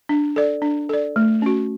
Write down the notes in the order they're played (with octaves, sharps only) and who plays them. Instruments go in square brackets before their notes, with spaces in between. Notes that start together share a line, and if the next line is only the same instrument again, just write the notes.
[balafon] D4
A4 D5
D4
A4 D5
A3
C#4 F#4